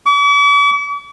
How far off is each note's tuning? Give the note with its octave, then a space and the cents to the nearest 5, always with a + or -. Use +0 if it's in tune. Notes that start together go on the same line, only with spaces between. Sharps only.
D6 -45